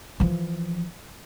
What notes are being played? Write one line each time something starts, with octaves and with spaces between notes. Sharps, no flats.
E3 F3